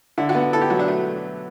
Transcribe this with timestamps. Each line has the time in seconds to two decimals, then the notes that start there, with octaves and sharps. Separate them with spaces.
0.18 D3 E4
0.29 F#4
0.35 B3
0.53 E4 A4
0.61 G4
0.70 F#3 F#4
0.79 D4
0.88 A3